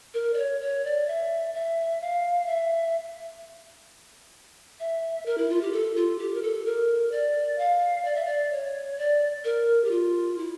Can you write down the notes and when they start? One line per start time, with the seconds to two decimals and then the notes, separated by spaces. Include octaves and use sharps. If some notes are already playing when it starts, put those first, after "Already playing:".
0.14 A#4
0.34 D5
0.38 C#5
0.61 C#5
0.85 D5
1.08 E5
1.54 E5
2.01 F5
2.46 E5
4.80 E5
5.26 A#4
5.38 E4
5.50 F4
5.61 G4
5.73 A4
5.96 F4
6.19 G4
6.34 A#4
6.42 A4
6.66 A#4
7.12 D5
7.58 F5
8.05 D5
8.15 E5
8.26 D5
8.52 C#5
8.98 D5
9.44 A#4
9.84 G4
9.91 F4
10.38 E4